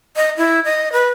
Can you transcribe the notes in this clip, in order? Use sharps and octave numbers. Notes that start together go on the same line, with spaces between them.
D#5
E4
D#5
B4